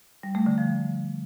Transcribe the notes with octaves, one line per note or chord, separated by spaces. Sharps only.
G3
A3
D3
F3